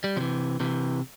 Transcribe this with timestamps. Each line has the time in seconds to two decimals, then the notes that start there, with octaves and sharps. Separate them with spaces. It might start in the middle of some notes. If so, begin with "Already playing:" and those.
0.04 G3
0.16 C3 F3
0.21 E3
0.60 C3 E3